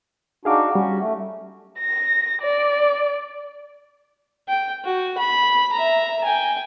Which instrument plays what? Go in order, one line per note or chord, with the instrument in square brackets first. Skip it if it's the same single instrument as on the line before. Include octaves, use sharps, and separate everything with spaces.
[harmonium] D4 D#4 F#4 [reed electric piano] G#4 F5 D6
[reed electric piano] G3 [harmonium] C#4 F#4
[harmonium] A3
[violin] A#6
D5
[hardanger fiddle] G5
F#4
B5
E5 A#5
G5 G#5